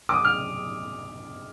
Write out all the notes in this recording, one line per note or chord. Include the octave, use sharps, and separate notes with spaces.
D6
D#6
F6